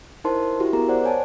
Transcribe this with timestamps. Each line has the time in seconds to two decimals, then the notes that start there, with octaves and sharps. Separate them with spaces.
0.24 D#4 E4 A#4 C5 A5 C6
0.60 E4 F#4 G4
0.73 B3 G#4 A#4 A#5
0.89 C5 D5 F#5
1.04 C#5 G#5 A5